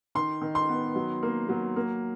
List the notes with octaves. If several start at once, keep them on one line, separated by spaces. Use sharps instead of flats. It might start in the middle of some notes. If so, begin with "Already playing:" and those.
D#3 C6
D#3
C6
B3
F#3
A#3
F#3
A#3